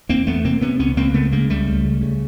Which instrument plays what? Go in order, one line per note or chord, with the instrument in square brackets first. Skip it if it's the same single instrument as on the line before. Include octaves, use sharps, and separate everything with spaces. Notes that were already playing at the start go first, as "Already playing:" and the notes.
[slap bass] E2 A#3 C4
E2 A3 B3
C3 A#3 C4
C3 B3 C#4
C#2 B3 C#4
C#2 A#3 C4
C#3 A3 B3
C#3 G#3 A#3
C#2 G3 A3
C#2
C#3
C#3